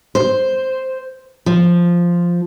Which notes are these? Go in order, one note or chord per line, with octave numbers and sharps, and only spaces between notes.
C5
F3